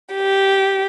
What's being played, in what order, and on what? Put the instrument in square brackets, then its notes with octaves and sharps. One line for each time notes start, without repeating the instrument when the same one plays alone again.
[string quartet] G4